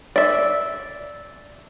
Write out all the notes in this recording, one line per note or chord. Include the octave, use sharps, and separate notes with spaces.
D5 E5